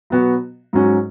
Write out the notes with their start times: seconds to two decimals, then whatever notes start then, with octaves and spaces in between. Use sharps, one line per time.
0.10 B2 F#3 B3 F#4
0.73 G#2 F#3 C#4 F#4